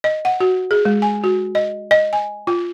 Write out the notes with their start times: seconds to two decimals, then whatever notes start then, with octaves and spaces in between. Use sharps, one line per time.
0.04 D#5
0.25 F#5
0.40 F#4
0.71 G#4
0.85 G#3
1.02 G#5
1.24 F#4
1.55 D#5
1.91 D#5
2.13 G#5
2.47 F4